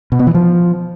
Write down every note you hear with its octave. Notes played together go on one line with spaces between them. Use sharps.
B2
B3
E3
F3